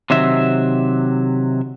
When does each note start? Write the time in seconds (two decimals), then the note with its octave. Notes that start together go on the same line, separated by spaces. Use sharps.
0.10 C3 D#3 F#3 E5